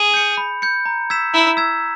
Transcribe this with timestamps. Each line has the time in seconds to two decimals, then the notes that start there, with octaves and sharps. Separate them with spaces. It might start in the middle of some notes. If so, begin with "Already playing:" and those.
Already playing: G#4
0.14 G6 C#7
0.37 B5
0.62 G6 C#7
0.86 A#5
1.10 E6 G#6 B6 E7
1.33 E4 A#5
1.57 E6 G#6 B6 E7